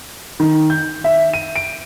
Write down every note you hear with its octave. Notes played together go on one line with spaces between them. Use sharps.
D#3
G6
E5
D#7
D7